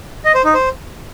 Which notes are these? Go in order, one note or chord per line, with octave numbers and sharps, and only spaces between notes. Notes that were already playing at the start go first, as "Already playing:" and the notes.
D#5
C5
D#4
C5